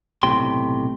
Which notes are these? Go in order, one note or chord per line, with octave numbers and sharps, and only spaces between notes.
B1 A2 C3 G5 C6